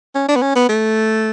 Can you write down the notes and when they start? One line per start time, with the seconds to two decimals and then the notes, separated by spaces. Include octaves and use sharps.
0.15 C#4
0.28 D4
0.36 B3
0.42 C#4
0.55 B3
0.69 A3